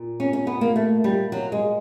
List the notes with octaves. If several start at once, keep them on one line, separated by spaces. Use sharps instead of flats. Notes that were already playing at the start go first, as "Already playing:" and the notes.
Already playing: A#2
C#4
C#4
B3
A#3
A3
G3
F#3
G#3